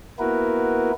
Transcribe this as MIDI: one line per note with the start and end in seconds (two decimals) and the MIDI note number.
0.19 0.92 58
0.19 0.92 59
0.19 0.92 64
0.19 0.92 66
0.19 0.92 70
0.19 0.92 71